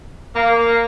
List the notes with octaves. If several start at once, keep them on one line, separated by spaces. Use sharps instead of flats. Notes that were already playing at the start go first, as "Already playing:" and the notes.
A#3